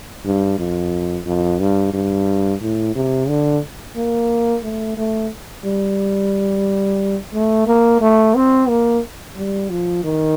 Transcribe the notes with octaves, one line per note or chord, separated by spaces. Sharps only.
G2
F2
F2
G2
G2
A2
C3
D3
A#3
A3
A3
G3
A3
A#3
A3
C4
A#3
G3
F3
D#3